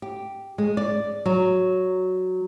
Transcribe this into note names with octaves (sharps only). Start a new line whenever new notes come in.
G4
G#3
D5
F#3